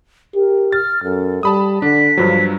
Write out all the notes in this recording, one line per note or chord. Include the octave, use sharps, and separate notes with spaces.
G4 A#4
F6 A6
F#2 A4
G3 A5 B5 D#6
D3 D4 B6
G2 F3 F#3